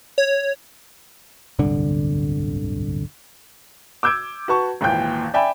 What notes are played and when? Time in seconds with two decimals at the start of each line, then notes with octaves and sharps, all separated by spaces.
0.18 C#5
1.59 D1 G1 C2 D3
4.03 D6 E6 G6 G#6 D7
4.48 F#4 B4 A5 C#6
4.81 G#1 D#2 A#2 E3 G5 G6
5.34 D5 E5 G5 G#5 B5